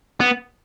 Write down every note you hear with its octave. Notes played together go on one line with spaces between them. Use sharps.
B3